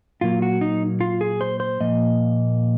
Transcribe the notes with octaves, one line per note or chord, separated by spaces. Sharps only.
A#2 F#3 A#3 F4
F#4
D#4
F4
G#4
C5
C5
A#2 F3 A#3 D#5